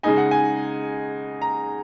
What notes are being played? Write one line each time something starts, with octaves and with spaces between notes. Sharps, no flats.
C#3 G#3 D#4 G#5
F#5
G#5
A#5